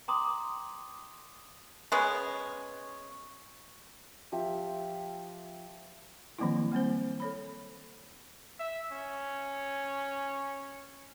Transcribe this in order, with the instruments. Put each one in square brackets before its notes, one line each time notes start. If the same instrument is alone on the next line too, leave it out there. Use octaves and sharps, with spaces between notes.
[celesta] G5 A#5 C6 D6 D#6 F#7
[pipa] G#3 B3 C#4
[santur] F3 G4 E5
[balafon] D#3 F3 F#3 A#3 C4 E4
G3 A#3 C4 C5
A4 C#5 B5
[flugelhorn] E5
C#4